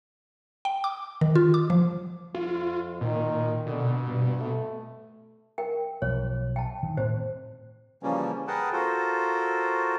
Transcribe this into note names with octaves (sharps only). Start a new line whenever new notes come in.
G5
D6
D#3
F4
D6
F3
F2 F4
A#2 D#3
B2 D3
G2
A3
A#4 G5
B1 F3 C#5
G5 A5
D#3
A2 C4 C5
C#3 E3 F3 G3 A#3 C#4
G#4 A#4 B4 F#5 G5 A5
F4 F#4 A4 A#4 C5